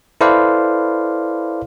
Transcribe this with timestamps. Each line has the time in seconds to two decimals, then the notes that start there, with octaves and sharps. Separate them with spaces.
0.21 E4 A4 B4 C5 D5 F5